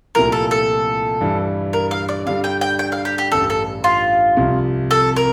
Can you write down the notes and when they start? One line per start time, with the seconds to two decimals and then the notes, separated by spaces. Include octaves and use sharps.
0.15 C2 A#2 F3 A3 E4 A#4
0.32 A4
0.51 A4
1.21 G2 E3 G3
1.73 A#4
1.91 F5
2.09 D5
2.26 G2 D3 G3 D4 F5
2.44 G5
2.61 G5
2.79 G5
2.92 F5
3.05 G4
3.18 G4
3.32 A1 G2 D3 A4
3.50 A4
3.84 F4
4.37 C2 C3 F3
4.91 A4
5.16 A#4